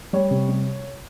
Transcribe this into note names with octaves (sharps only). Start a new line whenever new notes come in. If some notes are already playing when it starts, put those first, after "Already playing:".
G3 C#5
C3
G3